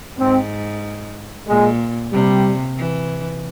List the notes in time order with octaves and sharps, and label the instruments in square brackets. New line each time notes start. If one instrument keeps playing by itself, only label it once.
[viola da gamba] G#2 [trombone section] C4
[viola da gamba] A#2 [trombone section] G#3
[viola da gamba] C3 [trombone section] G3
[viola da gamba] E3